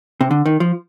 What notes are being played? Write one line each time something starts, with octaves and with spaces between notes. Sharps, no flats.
C3
D3
D#3
F3